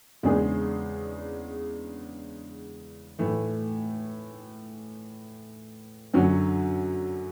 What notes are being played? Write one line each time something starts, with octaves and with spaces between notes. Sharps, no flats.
E2 C#3 G#3 D4 G#4
A2 E3 A3
F#2 D3 F#3 C#4 F#4